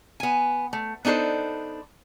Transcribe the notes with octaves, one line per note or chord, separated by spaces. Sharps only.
B3 G#5
A3
B3 D4 D#4 A4 C5